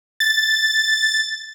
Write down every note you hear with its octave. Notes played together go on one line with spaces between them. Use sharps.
A6